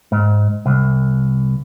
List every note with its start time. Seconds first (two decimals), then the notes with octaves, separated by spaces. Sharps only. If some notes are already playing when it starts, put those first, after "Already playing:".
0.12 G#2
0.66 C2